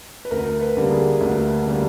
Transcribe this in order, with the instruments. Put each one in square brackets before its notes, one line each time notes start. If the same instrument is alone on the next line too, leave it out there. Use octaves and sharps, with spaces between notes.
[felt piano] B4
D2 A#4
B4
D3 G3 A#3
G#4
D2
D3 G3 A#3